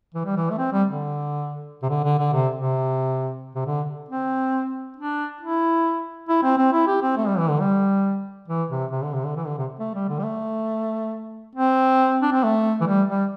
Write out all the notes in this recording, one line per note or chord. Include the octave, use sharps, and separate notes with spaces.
E3
G3
E3
A3
C4
G3
D3
C3
D3
D3
D3
C3
C3
C3
D3
C4
D4
E4
E4
C4
C4
E4
G4
C4
A3
G3
E3
D3
G3
E3
C3
C3
D3
C3
D3
E3
D3
C3
A3
G3
D3
G3
A3
C4
D4
C4
A3
E3
G3
G3